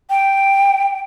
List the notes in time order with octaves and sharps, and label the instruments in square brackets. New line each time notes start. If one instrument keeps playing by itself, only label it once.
[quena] G5